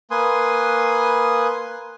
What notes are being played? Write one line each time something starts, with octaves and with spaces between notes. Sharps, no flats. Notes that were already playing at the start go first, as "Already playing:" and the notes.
A#3 B4 G#5 C6 D#6